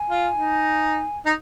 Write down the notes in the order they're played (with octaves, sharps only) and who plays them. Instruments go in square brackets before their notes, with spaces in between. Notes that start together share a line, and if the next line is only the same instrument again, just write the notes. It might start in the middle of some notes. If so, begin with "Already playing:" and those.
Already playing: [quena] G#5
[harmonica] F4
D#4
D#4